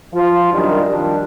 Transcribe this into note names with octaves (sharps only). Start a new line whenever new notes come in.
F3 F4
F#2 C3 D#3 G3 D4
D#3 F3 G3 D4